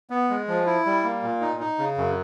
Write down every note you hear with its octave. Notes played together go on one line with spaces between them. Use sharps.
B3
G#3
F3
E4
G3
A#3
A#2
D#4
D#4
C#3
F#2